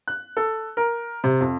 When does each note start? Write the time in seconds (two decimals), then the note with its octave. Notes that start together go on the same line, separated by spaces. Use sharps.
0.08 F#6
0.37 A4
0.77 A#4
1.24 C3
1.41 F2